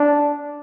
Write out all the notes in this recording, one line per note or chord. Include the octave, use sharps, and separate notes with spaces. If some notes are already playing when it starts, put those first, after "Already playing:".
Already playing: D4